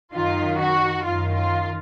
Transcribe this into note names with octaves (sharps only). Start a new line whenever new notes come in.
F#2 D#3 F4
F#4
F#2 D#3 F4
F4